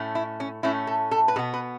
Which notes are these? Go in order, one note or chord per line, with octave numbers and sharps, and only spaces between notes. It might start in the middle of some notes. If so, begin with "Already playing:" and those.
Already playing: A2 A3 C#4
E4
C#4
A2 A3 C#4 E4
A4
A4
B4
B2 B3 A4
B4